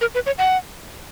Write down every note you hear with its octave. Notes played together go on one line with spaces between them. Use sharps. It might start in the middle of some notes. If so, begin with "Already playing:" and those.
A#4
B4
C#5
F#5